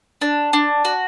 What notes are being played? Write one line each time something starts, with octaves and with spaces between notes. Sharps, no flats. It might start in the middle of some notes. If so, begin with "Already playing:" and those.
D4
D4
F#4